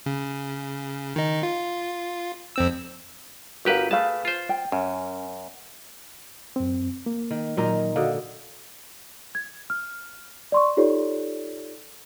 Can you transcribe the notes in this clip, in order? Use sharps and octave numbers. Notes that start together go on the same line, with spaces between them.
C#3
D#3 D#4
F4
F2 C4 E6
G1 F#4 G4 A#4 B4 F5
A3 G#4 B4 F5 A5
F4 C5
G5
F#2 C#4
F#2 C4
A#3
D#3
A#2 F#3 D#4 A#4
D3 F#4 D#5 F5
G#6
F6
D5 C6 C#6
D#4 F4 G4 A4 C#5 D5